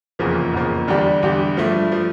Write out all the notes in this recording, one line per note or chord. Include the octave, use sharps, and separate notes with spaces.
F1 E2 C#3 F3 A#3
F1 E2 C#3 F3 A#3
E2 D3 G3 D4 G4
E2 D3 G3 D4 G4
G2 F3 A3
F3 A3